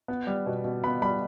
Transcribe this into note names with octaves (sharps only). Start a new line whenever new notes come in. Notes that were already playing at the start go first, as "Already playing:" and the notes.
B3
G3
B2
B2
B3 B5
G3 B5